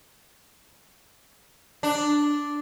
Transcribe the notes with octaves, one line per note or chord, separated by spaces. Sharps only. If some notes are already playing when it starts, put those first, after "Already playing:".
D4